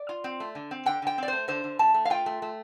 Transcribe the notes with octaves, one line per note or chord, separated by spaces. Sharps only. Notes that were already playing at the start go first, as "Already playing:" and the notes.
Already playing: D5
F4
C4
A3
D3
C4
D3 G5
D3 G5
C4 D5
A3 C5
D3 C5
D3
A3 A5
A3
F5
F4 G5
A3
A3